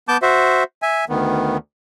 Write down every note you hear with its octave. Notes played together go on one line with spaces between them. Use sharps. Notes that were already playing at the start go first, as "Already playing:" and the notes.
B3 A5 D6 G6
F#4 C5 E5
E5 G#5
D2 D#3 B3